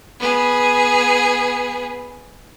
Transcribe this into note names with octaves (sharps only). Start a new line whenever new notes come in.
B3 G#4